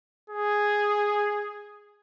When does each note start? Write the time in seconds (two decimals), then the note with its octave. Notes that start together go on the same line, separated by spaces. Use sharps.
0.30 G#4